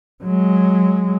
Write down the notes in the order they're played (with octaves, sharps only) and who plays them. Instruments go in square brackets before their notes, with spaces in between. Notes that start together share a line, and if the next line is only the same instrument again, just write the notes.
[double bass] F#3 G#3